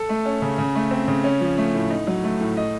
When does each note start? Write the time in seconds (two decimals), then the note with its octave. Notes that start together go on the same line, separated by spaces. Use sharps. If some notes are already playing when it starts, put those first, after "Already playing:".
Already playing: A4
0.09 A3
0.25 C#4
0.42 C#3
0.58 C#3
0.75 A3
0.91 C4
1.08 C#3
1.24 C#4
1.41 F3
1.57 A3
1.74 A2
1.90 D#4
2.07 F#3
2.24 A3
2.41 A2
2.57 D#5